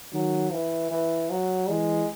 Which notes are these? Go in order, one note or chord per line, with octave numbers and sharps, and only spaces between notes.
D#3 F#3
E3
E3
F#3
E3 G#3